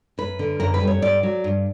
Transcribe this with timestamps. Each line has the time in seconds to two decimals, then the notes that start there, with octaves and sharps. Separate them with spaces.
0.18 F#2 B4
0.39 D3
0.60 F#2 A#4
0.74 B4
0.80 G3
0.87 C#5
1.02 G2 D5
1.23 F#3
1.44 G2